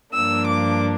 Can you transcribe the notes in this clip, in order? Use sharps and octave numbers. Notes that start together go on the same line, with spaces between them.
G2 F3 A#3 D4 E6
D6